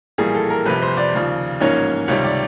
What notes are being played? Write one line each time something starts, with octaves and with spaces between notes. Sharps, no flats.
A#1 A2 E3 G3 A#3 G#4
A4
A#4
G1 F2 C3 B4
C5
D5
D#2 C#3 F3
A1 G#2 F3 A#3 C#4 C#5
C#2 C3 D#3 G3 C#5
D5